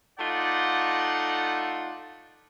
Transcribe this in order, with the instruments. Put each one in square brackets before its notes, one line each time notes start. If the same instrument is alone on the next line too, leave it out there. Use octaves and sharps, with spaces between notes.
[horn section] A3 D#4 F4 D5 F#5